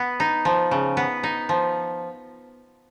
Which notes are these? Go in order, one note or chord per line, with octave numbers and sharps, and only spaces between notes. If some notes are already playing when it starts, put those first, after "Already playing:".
Already playing: B3
D#4
F3
C#3
B3
D#4
F3